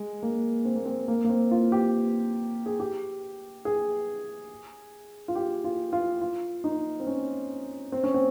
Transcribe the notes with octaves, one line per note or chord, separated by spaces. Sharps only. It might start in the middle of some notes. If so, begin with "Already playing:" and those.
Already playing: G#3
A#3
C4
A#3
C4
A#3
A#3
C4
F4
G4
G#4
G4
G#4
F4
G4
F4
F4
F4
D#4
C4
C#4
C4
C#4
C4